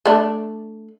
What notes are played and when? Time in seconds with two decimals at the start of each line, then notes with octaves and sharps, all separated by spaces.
0.05 A3 D4